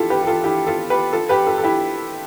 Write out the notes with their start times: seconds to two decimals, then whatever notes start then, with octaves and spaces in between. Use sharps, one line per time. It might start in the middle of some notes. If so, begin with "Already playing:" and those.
Already playing: E4 F4 G4 A4
0.10 G4 B4
0.23 G4
0.27 F4 A4
0.44 E4 G4
0.67 F4 A4
0.90 G4 B4
1.13 F4 A4
1.29 G4 B4
1.47 F4 A4
1.58 A4
1.64 E4 G4